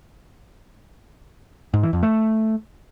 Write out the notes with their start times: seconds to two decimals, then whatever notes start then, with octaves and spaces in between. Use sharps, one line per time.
1.74 G#2
1.83 E3
1.93 F2
2.03 A3